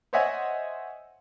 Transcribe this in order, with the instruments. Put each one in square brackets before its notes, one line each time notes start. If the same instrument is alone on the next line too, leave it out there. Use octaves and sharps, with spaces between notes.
[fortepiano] C5 C#5 D#5 E5 F#5 G#5